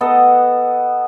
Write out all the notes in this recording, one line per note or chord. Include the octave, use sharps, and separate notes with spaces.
B3 A4 D#5